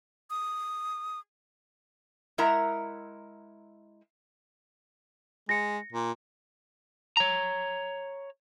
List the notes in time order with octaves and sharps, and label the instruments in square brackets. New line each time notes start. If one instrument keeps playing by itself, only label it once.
[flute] D#6
[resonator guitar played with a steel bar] G#3 E4 A#4 E5 F#5 A#5
[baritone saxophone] G#3 [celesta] A#6 C#7
[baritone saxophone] A#2
[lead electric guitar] C#5 A#5